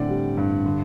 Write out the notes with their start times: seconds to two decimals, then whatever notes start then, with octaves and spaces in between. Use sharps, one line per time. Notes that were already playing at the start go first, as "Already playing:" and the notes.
Already playing: A2 D3 C4 D5 F#5
0.09 G3
0.37 G2
0.65 D3